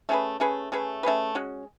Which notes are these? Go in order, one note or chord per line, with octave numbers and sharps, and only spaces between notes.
A3 C#4 G#4 B4
A3 C#4 G#4 B4
A3 C#4 G#4 B4
A3 C#4 G#4 B4
G#3 C#4 F#4